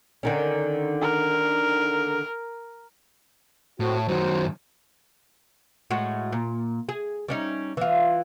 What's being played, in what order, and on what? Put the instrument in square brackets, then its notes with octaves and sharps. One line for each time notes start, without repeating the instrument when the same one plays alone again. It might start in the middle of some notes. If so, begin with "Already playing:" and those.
[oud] D3 D#3 C#4
[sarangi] A#4
[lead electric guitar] A2 [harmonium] C4 F#4
[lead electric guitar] F#2 D#3 [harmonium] F#4 C5
[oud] A2 G#3 F#4
A#2
G#4
G3 C#4 D#4
E3 F4